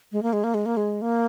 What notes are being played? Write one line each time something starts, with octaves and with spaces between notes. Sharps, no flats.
G#3
A#3
G#3
A#3
G#3
A#3
G#3
A#3